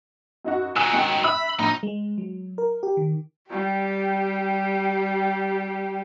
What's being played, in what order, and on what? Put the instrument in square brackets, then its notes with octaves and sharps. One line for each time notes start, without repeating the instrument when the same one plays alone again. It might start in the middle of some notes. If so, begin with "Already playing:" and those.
[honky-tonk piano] F#2 D#4 F#4
[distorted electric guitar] D#3 F#3 [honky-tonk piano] G#5 E6 F#6
[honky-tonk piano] G#3 G5
[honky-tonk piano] E5 E6 [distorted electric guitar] B5
[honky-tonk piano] A#1 B5 [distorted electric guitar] D#4
[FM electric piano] G#3
F#3
A#4
G4
D#3
[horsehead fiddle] G3 G4